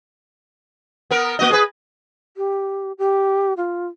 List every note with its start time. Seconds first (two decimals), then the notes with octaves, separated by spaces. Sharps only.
1.11 B3 A#4
1.39 A#3 F#4 D#5
1.50 G#4 B4
2.37 G4
2.98 G4
3.57 F4